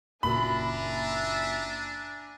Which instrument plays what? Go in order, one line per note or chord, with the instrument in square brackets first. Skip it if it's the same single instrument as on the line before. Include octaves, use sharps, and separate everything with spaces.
[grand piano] F#1 A#2 F#4 [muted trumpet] D4 [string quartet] E5 G#5 A#5 [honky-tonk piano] B5